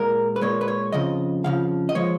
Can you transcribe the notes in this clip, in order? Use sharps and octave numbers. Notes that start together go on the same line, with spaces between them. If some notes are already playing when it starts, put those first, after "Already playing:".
Already playing: A#2 G#3 A#4
B4
A#2 G#3 C#5
B4
C#5
F2 C#3 F3 D#5
F2 C#3 F3 F5
D#5
F3 G#3 C#5